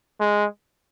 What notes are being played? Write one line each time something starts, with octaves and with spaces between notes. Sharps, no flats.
G#3